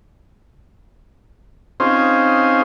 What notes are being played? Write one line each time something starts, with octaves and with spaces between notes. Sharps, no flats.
C4 C#4 D#4 F4 G#4 C5